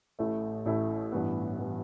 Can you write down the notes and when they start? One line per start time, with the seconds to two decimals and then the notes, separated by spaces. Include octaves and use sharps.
0.19 A1 A2 A3 E4
0.66 A1 A2 A3 E4
1.12 A1 G2 E3 B3
1.58 E3 B3